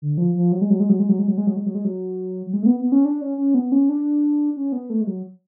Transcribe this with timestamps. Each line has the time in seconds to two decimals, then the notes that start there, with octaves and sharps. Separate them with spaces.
0.02 D3
0.18 F3
0.35 F3
0.52 F#3
0.61 G#3
0.70 F#3
0.80 G#3
0.89 F#3
0.99 G#3
1.09 F#3
1.19 G#3
1.28 F#3
1.38 G#3
1.47 F#3
1.56 G#3
1.66 F#3
1.75 G#3
1.85 F#3
2.46 F#3
2.53 G#3
2.63 A3
2.66 B3
2.80 B3
2.92 C#4
3.05 D4
3.21 C#4
3.38 C#4
3.54 B3
3.72 C#4
3.89 D4
4.57 C#4
4.72 B3
4.90 A3
5.01 G#3
5.07 F#3